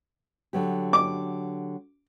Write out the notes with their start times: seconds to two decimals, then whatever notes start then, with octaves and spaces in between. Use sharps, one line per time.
0.53 D3 F#3 G4
0.93 D6